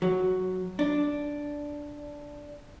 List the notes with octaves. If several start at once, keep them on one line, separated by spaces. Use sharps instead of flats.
F#3
D4